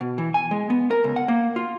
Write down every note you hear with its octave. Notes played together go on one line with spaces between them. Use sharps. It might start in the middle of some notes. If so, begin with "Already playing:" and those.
B2
E3
G#5
G#3
B3
A#4
C#2
F#5
A#3
F4